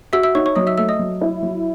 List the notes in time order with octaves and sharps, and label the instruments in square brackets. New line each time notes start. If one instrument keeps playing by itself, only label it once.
[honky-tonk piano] F#4 [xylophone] E5 E6
[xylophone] E5 E6
[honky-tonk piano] D#4 [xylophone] C#5 C#6
[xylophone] C#5 C#6
[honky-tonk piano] F#3 [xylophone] D#5 D#6
[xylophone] E5 E6
[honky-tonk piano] A3 [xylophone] E5 E6
[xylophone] D#5 D#6
[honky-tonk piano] F#3
E4
F#3